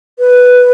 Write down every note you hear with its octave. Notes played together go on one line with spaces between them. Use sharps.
B4